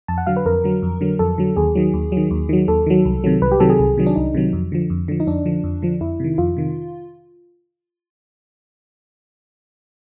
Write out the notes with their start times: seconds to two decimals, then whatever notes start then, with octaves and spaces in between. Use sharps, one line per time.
0.08 F2 A5
0.18 F#5
0.26 D3 F#3 F5
0.37 B4
0.46 F2 A#4
0.64 D3 F#3
0.82 F2
1.01 D3 F#3
1.19 F2 A4
1.38 D3 F#3
1.56 D#2 G#4
1.75 D#3 F#3
1.94 D#2
2.12 D#3 F#3
2.31 D#2
2.49 D#3 F#3
2.68 D#2 A4
2.86 D#3 F#3
3.05 C2
3.24 C3 D#3 F#3
3.42 C2 B4
3.51 G4
3.60 C3 D#3 F#3 A4
3.70 G#4
3.79 C2
3.97 C3 D#3 F#3
4.06 D4
4.16 C2 D#4
4.34 C3 D#3 F#3
4.53 F2
4.72 D3 F3
4.90 F2
5.08 D3 F3
5.20 D#4
5.27 F2 D4
5.45 D3 F3
5.64 F2
5.82 D3 F3
6.01 F2 E4
6.20 C3 D#3
6.38 F2 F4
6.57 C3 D#3